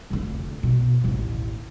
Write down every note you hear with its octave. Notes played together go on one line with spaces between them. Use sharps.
F1 D3
B2
A1 D#2